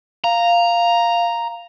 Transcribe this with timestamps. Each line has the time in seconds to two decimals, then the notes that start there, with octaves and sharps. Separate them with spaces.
0.24 F5 A#5